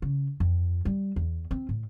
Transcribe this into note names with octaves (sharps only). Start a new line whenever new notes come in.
C#3
F2
G3
E2
C4
A2